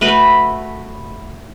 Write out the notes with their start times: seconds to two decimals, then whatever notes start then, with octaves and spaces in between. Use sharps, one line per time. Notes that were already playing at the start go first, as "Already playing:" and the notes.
0.01 A3 F#4 B4